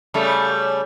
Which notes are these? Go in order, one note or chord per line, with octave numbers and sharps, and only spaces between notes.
C#3 G3 A3